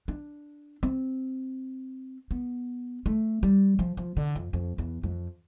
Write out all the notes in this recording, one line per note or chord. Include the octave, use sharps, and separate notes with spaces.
D4
C4
B3
A3
G3
F3
F3
D3
F2
F2
E2
F2